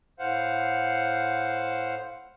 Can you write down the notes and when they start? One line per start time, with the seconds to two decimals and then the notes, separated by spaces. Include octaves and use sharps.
0.19 A2 C5 F5 F#5